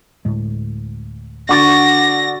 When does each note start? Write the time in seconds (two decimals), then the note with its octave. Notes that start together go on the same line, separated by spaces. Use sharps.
0.25 D2 A2 G#3
1.49 D3 F#4 D6 A6 A#6